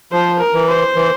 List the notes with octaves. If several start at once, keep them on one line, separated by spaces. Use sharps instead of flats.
F3 C5
A#4
E3
C5
E3